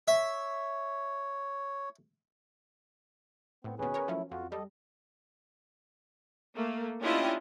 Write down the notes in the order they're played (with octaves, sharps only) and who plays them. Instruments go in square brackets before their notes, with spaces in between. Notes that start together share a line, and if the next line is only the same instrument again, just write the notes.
[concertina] C#5 [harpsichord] E5
[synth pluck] A2 [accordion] B3 C4
[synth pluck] D#2 B2 [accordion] C#4 G#4 B4
[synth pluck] A#4 C#5
[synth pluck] F3 F#3 C#4 [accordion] A3 E4
[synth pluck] F2 [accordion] F4 F#4
[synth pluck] G3 [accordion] A4 D#5
[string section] A3 A#3
C#4 D4 E4 F4 G4 D#5